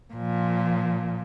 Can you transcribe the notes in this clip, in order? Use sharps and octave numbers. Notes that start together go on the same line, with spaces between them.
A#2 F3